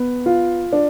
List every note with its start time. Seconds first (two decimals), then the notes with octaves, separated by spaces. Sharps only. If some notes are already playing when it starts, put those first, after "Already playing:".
Already playing: B3
0.26 F4
0.73 D4